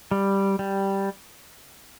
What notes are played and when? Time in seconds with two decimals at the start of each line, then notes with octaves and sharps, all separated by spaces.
0.11 G3
0.59 G3